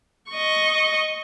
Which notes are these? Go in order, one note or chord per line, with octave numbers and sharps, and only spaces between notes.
D#5 C#6